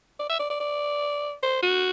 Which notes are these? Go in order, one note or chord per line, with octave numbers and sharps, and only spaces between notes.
D5
E5
D5
D5
D5
C5
F#4